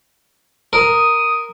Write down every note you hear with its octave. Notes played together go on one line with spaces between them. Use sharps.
A#4 D#6